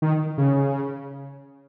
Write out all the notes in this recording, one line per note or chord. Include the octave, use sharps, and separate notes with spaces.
D#3
C#3